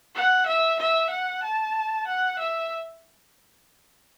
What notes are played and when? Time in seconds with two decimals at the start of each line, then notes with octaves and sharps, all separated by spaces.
0.15 F#5
0.47 E5
0.80 E5
1.10 F#5
1.43 A5
2.07 F#5
2.39 E5